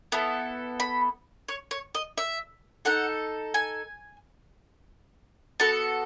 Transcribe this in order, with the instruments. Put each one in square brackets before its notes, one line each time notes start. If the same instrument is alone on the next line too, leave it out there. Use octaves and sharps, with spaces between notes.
[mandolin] B3 E4 A4
B5
C#5
C#5
D#5
E5
D#4 A4 F#5
G#5
B3 F#4 A4 A5